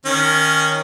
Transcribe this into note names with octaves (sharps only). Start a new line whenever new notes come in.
D#3 C#4